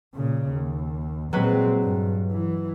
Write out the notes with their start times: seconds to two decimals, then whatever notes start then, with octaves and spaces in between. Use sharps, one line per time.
0.15 A#2 C#3
0.51 D#2
1.33 A#2 F#3 G#3 C4 B4
1.83 G2
2.31 E3